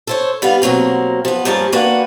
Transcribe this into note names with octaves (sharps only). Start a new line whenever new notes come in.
A4 C5 C#5
G3 B3 B4 F5
B2 F#3 A#3 C4
F3 B3
G2 F3 A#3 C#4 G#4 A5
A#3 D4 F#4 B4 G5